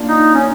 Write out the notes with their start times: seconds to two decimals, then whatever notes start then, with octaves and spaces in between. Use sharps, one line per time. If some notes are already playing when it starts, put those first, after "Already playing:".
Already playing: A#3 D4 F4
0.09 D#4
0.35 C#4